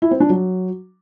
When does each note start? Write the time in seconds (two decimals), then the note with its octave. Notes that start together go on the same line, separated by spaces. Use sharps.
0.02 E4
0.11 C4
0.20 D4
0.30 F#3